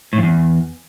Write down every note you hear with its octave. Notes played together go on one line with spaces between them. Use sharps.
A2
F2
E2